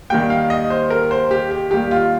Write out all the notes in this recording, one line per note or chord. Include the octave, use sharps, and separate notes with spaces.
D#3 G3 A#3 G5
F5
D#5
C5
A#4
C5
G4
G4
D#3 G3 A#3 G4
F4